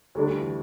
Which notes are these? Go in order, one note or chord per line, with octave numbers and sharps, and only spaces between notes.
D2 D3 G3 A3 D4
G3
E3